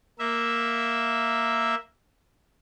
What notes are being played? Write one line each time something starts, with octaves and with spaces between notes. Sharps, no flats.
A#3 E5